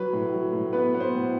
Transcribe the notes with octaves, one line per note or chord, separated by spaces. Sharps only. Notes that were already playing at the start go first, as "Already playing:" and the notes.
Already playing: F#3 B4
A2
F#3
A2
B3 B4
B3
C5
A2